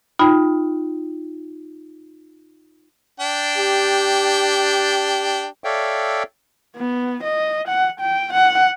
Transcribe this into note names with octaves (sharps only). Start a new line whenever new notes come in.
D#4 F4 G5 B5
D4 G5
G4
A4 C#5 D5 E5 F5 G5
B3
D#5
F#5
G5
F#5